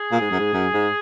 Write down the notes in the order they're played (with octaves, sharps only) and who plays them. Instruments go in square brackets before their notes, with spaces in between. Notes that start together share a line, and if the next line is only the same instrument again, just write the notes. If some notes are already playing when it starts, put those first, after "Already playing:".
Already playing: [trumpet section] G#4
[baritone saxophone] A#2
G#2
F#2
G#2
F#2
G#2